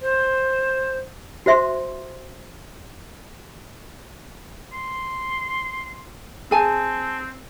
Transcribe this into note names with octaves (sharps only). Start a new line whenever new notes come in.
C5
F#4 C5 E5 C6
C6
C4 G#4 G#5 A5